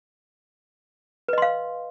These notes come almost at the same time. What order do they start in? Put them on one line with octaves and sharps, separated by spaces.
B4 D#5 C6 F5